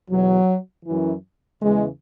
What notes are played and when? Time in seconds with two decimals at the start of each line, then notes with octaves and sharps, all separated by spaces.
0.10 E2 B2 F#3
0.85 F#2 E3
1.61 E2 C#3 E3 G#3